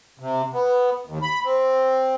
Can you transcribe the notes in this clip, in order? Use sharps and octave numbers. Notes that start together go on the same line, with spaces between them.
C3
B3
D#2
B5
C4